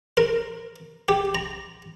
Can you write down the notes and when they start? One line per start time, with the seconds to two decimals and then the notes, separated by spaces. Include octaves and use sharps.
0.17 A#4
1.09 G4
1.35 A#5